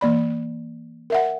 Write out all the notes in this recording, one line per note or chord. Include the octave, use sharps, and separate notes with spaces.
E3 A#3 D5 B5
A#4 E5 F#5